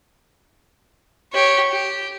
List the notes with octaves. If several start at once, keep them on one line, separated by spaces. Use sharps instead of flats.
G4 C#5
G4